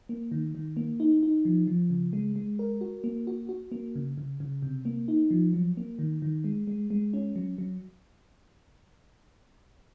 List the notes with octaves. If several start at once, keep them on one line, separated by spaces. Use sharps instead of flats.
A#3
D#3
D#3
A#3
D#4
D#4
F3
F3
C#3
G#3
G#3
A#4
F#4
A#3
F#4
F#4
A#3
C#3
C#3
C#3
C3
A#3
D#4
F3
F#3
A#3
D#3
D#3
G#3
G#3
G#3
C#4
F#3
F#3